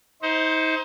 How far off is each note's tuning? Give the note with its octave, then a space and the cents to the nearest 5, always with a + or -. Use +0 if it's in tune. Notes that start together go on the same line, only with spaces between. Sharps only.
D#4 +35 C5 +0